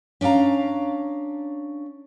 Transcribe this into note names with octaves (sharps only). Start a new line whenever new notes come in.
C#4 D4 D5 F5 A#5